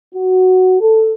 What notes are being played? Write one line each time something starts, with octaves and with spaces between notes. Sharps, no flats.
F#4
A4